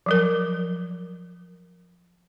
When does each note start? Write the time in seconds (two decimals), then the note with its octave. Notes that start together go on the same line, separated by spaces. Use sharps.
0.06 F3 F#3 A#4